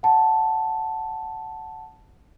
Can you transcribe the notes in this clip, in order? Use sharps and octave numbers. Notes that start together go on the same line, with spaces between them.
F#5 A5